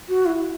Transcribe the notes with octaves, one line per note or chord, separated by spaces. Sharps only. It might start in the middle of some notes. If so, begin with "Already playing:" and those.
F#4
E4